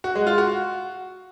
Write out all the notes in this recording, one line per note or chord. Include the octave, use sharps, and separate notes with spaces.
F#4
G#3
F4
F#4